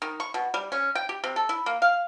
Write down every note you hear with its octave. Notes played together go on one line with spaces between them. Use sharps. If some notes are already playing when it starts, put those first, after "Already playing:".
D#3
C#6
B2
G3
C#4
G5
G4
C3
A4
E4
A#3
F5